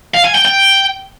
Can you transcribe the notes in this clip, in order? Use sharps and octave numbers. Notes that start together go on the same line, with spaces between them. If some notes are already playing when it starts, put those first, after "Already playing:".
F5
G#5
G5
G5